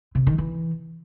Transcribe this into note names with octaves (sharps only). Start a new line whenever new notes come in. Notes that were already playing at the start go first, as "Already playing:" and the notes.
C3
D#3
E3